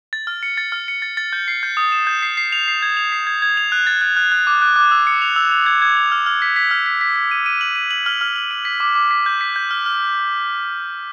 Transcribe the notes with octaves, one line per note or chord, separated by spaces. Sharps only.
A6
F6
C#7
A6
F6
C#7
A6
A6
G6
C7
G6
D#6
E7
G6
C7
C7
F7
C7
G#6
F7
C7
G#6
G#6
F7
F#6
A6
F#6
F#6
F#6
D6
F#6
D6
E6
C#7
F7
E6
F7
G#6
G#6
F7
F6
F6
B6
B6
F6
B6
B6
B6
D#7
D#7
F#7
D#7
F#7
F6
F6
F#7
D#7
B6
D6
D6
B6
G6
B6
G6
F6
F6